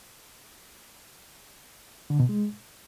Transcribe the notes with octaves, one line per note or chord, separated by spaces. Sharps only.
D3
B2
G#3